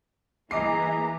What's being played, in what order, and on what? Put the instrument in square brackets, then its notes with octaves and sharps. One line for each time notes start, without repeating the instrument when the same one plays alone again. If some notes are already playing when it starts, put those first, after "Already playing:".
[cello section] E3 A#3 [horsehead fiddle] G#4 A#5 [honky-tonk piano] D#5 D6 C7